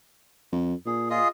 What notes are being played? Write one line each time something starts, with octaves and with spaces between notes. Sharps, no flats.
F2
A#2 G#4
F4 G#4 D#5